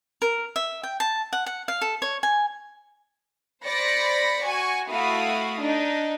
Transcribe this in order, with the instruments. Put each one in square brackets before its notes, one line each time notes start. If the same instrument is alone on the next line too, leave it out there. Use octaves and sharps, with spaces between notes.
[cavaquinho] A#4
E5
G5
A5
F#5
F#5
F5
A4
C#5
G#5
[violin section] C5 D5 B5 A#6 C#7
F#4 G#5 C#6
A3 E4 F#4 F5 B5 D#6
D4 D#4